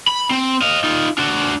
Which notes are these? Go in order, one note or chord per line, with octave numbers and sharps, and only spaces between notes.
B5
C4
D#5 F5
D#4 F4
D4 F#4